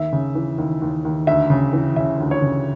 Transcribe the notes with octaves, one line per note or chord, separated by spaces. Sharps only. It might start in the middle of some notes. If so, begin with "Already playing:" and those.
Already playing: D#2 E5
C#3
E3
D#2
D#2
D#2
D2 E5
C#3
E3
C#3 E5
D2
C#5
C#3